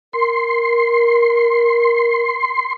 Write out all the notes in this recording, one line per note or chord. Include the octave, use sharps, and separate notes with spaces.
A#4 C6